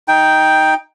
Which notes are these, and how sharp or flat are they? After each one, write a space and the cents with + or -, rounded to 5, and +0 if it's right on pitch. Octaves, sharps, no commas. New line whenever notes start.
D#4 +10 G5 +0